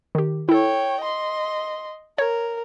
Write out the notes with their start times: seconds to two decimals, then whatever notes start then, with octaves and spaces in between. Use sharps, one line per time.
0.15 D#3 G4
0.49 E4 A4 C#5 G5
1.01 D#5 C6
2.18 A#4 C#5